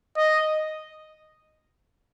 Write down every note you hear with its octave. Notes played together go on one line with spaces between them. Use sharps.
D#5